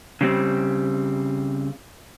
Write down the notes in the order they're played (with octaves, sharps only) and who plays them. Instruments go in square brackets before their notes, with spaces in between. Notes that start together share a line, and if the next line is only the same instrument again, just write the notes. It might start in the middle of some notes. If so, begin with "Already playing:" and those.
[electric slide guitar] C#3 G3 C4